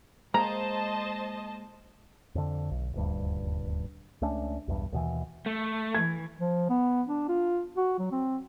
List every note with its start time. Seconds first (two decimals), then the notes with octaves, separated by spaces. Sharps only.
0.34 G#3 A#3 C5 D#5 A5 A#5
2.35 F2 D3
2.71 B1
2.94 D#1 D2 G2
4.21 C#2 A3 C#4 D4
4.68 B1 E2 G2
4.92 D#2 B2 E3
5.46 A3
5.95 E3 G#6
6.40 F3
6.69 B3
7.08 D4
7.29 F4
7.77 F#4
7.98 F#3
8.12 C4